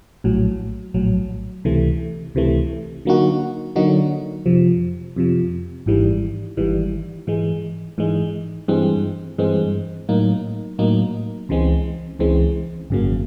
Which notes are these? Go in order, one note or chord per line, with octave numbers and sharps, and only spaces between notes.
A#1 A2 F#3
A#1 A2 F#3
C#2 C3 E3 A3
C#2 C3 E3 A3
D3 F#3 A#3 D#4 F#4
D3 F#3 A#3 D#4 F#4
F2 C3 F3
F2 C3 F3
G#1 G#2 E3 G3
G#1 G#2 E3 G3
G#2 E3 G#3
G#2 E3 G#3
G2 E3 G#3 C4
G2 E3 G#3 C4
A2 F#3 A#3 D#4
A2 F#3 A#3 D#4
C#2 C#3 E3 G#3 C4
C#2 C#3 E3 G#3 C4
G#1 F#2 C#3 F#3 A#3